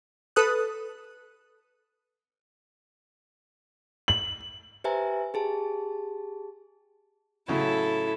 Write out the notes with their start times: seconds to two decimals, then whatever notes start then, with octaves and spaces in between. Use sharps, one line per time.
0.36 A4 B4 D#6 F#6
4.08 F#7
4.84 G4 B4 C5 E5 G#5 A#5
5.34 G4 G#4 A5
7.48 A2 C#3 F#3 E4 A4